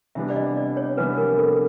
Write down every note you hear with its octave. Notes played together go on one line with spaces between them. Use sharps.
C3 E3 G3 B3 D4 E5
D5
D#5
D5
C#5
C3 E3 G3 B3 D4 B4
A#4
A4